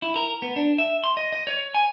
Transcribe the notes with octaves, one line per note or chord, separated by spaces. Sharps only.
E4
A#4
B3
D4
E5
C6
D#5
D#5
C#5
G#5